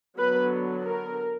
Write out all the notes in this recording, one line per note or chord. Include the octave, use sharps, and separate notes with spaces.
D3 F#3 B3 B4
A#4